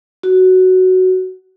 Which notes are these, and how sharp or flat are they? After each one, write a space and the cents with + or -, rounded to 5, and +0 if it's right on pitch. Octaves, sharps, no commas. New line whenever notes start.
F#4 +5